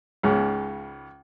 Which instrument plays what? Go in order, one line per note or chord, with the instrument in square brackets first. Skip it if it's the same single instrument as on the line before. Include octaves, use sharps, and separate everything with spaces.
[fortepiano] C#2 G#2 C#3